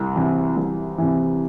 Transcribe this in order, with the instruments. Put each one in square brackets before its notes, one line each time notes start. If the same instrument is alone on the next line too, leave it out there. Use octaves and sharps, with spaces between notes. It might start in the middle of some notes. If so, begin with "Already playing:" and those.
Already playing: [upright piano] C2
C3 E3
C2
C3 E3